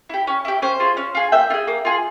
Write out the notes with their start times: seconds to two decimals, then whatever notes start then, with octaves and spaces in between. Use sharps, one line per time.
0.09 E4 G4
0.27 C#4
0.45 E4 G4
0.62 C#4 C5
0.80 F4 G#4
0.97 C#4
1.15 F4 G#4
1.32 A#3 E5 G5
1.50 F4
1.54 G#4
1.67 A#3
1.85 F4 G#4